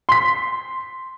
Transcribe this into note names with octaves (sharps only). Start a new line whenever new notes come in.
C6 B6